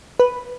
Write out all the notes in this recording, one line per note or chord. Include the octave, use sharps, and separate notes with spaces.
B4